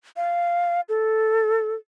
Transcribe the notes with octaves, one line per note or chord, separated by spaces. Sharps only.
F5
A4